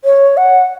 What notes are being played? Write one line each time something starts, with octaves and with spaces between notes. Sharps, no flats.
C#5
F#5